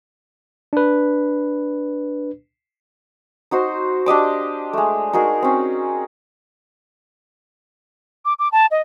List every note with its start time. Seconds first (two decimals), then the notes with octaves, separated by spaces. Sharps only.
0.73 D4 B4
3.51 D#4 F#4 C5 C6
4.06 D4 G4 D#5 D6
4.73 G#3 A3
5.13 D#4 F#4 G#4 A#4
5.42 C4 C#4
8.25 D6
8.39 D6
8.52 A5
8.71 D#5